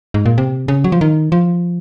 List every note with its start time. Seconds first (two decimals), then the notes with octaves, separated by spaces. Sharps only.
0.14 G#2
0.26 A#2
0.38 C3
0.68 C#3
0.84 F#3
0.92 F3
1.01 D#3
1.32 F3